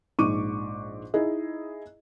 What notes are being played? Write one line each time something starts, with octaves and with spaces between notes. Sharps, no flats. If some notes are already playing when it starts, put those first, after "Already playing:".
A#1 G#2 C#6 D6 D#7
D#4 E4 G#4 D#5